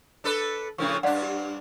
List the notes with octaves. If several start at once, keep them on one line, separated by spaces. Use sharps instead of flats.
D4 A4 B4
A2 C#3 F3 D4 A#4 C#6
G2 D4 D5 F5 F#5
G4